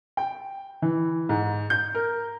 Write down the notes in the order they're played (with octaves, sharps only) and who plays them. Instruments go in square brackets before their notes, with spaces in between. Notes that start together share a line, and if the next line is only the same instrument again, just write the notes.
[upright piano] G5
E3
G#2
G6
A#4